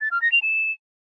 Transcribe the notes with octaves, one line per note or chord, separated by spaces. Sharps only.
A6
F6
A#6
F7
E7